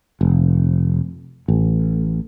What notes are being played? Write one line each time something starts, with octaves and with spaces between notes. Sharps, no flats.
F1
A1